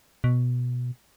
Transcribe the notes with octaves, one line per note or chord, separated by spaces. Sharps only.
B2